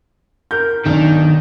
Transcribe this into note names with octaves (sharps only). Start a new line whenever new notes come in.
A#4 G6
B1 D#3 D4